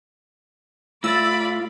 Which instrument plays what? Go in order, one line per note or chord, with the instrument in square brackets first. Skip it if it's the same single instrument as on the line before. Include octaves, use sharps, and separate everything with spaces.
[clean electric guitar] A2 A3 [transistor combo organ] F4 [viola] D5 B5 [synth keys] E6 A6